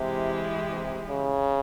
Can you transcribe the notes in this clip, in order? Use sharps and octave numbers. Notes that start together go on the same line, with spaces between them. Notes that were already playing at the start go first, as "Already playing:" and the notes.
Already playing: C3 E3 G#3 E4 G4
C3
C#3